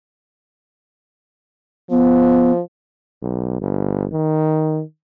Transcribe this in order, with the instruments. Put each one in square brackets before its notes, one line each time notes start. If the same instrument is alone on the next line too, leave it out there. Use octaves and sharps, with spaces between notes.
[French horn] F3 [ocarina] B3
[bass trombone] B1
G1
D#3